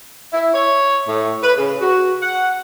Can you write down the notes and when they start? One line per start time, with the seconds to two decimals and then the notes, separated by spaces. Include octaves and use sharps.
0.32 E4
0.53 C#5
1.08 A2
1.41 B4
1.56 C#3
1.80 F#4
2.22 F#5